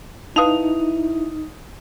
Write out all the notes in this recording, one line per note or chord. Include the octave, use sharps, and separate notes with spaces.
D#4 E4 B4 F5 A5 D#6 F7